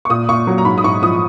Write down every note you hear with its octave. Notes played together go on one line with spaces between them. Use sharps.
C#6
A#2 D#6
A#2 C#6
F#3
A#5
G#2 B5
D#6
G#2 C#6
F3 D#6